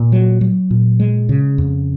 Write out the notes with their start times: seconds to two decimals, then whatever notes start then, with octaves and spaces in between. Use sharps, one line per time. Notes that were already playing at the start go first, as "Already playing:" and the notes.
Already playing: A#2
0.12 F#3
0.41 F#3
0.71 A#2
1.00 G#3
1.29 C#3
1.58 F2